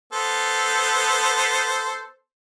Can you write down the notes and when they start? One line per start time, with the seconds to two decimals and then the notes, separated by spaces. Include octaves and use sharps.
0.13 B3 A4 C5